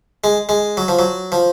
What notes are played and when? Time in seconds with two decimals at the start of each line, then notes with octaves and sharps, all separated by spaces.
0.24 G#3
0.49 G#3
0.77 F#3
0.88 F3
0.99 F#3
1.32 F3